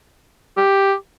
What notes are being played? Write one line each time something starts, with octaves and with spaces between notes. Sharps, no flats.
G4